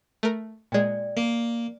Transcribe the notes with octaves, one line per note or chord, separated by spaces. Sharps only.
A3 A#4
A#2 G#3 D5 G5
A#3